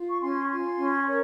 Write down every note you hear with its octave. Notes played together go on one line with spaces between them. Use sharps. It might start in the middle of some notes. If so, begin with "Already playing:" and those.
Already playing: F4
C#6
C#4 G#5 C6
C#6
F4 G#5 C6
C#4
A#4 C#5